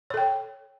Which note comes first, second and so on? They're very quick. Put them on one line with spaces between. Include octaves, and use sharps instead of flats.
C#5 A4 G5